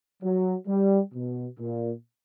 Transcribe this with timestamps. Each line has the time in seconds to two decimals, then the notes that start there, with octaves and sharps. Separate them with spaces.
0.23 F#3
0.68 G3
1.14 B2
1.60 A#2